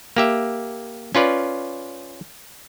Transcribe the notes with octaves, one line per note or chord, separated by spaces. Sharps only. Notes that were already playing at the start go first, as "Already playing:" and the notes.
A#3 G4 E5
C#4 F4 B4 D5